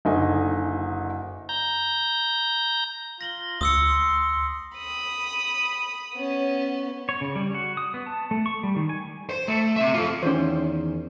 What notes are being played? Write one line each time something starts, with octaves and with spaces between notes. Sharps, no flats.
F#1 D3 D#4 D#5 G#5
A#5 G6
F4 A#6 F#7 G7
D2 C6 D#6 E6 C#7
B5 D#6
B3 C#4
C#5
C#3
G3
F#4
D#6
B3
A5
A3
C#6
G3
D#3
G#5
C5
A3
C4 E5
F4 A4
E2 D#3 C#4 C5